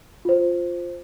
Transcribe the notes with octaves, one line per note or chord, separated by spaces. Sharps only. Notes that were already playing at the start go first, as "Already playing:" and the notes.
F4 C5